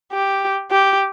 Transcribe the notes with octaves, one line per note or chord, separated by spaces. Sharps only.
G4
G4